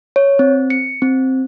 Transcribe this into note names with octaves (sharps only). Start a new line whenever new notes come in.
C#5
C4
C#7
C4